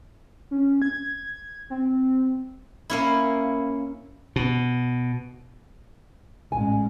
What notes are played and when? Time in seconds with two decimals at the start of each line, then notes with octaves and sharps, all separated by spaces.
0.51 C#4
0.82 G#6
1.70 C4
2.90 A#3 C#4 E4
4.36 B2
6.52 A1 G#3 G#5